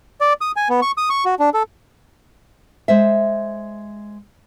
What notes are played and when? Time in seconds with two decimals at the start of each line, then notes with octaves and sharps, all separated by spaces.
0.21 D5
0.41 D#6
0.56 G#5
0.69 B3
0.82 C#6
0.98 D#6
1.10 C#6
1.25 F#4
1.40 D4
1.54 A4
2.88 G#3 C5 E5